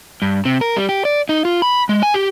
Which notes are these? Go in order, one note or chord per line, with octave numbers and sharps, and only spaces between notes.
G2
C3
A#4
G3
G4
D5
D#4
F4
B5
G#3
G#5
G4